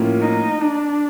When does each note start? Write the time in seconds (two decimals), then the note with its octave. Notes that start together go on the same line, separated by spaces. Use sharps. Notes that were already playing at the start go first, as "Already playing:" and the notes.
Already playing: A2 F3 A#3 C#4 F4
0.21 D#4
0.61 D4